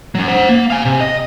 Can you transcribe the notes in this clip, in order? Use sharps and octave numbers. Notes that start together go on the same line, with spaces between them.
F#3 C#4
C5 F#5
A#3
F5 G#5
C3
D#5